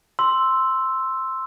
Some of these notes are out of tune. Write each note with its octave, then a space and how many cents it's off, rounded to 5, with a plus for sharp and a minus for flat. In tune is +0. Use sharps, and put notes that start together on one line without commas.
C6 +0 E6 +0